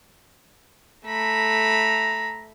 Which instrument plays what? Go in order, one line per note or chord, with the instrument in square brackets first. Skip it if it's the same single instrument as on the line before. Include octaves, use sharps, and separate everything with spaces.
[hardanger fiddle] A3 B5 [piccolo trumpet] A#5